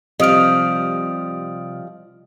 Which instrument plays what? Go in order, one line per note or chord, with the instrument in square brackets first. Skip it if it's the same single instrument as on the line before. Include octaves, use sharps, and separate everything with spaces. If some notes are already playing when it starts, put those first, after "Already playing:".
[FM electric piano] C3 F6 [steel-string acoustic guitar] F3 G3 [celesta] D#5 D#6 D7